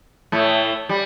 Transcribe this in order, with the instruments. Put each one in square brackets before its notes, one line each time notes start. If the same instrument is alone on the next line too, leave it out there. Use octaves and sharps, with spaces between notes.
[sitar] A2 A3
G3